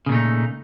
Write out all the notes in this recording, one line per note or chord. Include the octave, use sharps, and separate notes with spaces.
A#2 C#3 A3 D#4